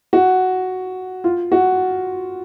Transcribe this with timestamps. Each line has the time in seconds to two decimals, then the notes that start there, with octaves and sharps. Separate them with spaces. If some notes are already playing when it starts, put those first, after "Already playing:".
0.13 F#4
1.24 F4
1.52 F#4